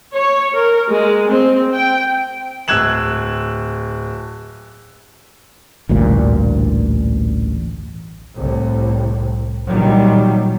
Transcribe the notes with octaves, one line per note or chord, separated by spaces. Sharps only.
C#5
A#4
G#3
C4
G5
D1 E6 F#6 G#6 E7 F#7
A1 D2 G2 A#2
C2 A2
A#2 D#3 F#3 G3